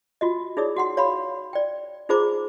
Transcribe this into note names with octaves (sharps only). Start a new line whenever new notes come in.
F4 F#4 D#5
D#4 E4 G#4 C#5 D5 D#6
F#4 F#5 C6
C#5 F5 B5 C6
D5 G5
D#4 F4 G#4 C5 A#5 D6